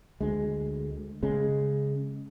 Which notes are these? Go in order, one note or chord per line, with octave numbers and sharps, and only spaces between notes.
D2 G#3
C#3 G#3